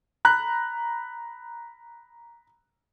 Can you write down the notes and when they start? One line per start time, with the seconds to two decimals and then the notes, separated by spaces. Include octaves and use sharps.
0.25 A#5 B5 F#6